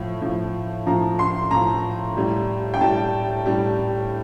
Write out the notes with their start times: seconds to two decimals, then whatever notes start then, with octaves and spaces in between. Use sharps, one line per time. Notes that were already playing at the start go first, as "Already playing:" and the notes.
Already playing: A2 F3
0.22 A2 F3
0.87 A2 F3 A#5
1.19 C6
1.51 A2 F3 A#5
2.17 A2 G3
2.74 G5
2.81 A2 G3 A5
3.46 A2 G3